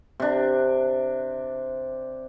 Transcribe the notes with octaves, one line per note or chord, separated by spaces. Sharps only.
C3 D4